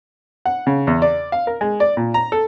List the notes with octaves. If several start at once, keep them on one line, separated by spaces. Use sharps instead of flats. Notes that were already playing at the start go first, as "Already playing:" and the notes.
F#5
C#3
E2
D5
F5
A#4
G#3
D5
A#2
A#5
A4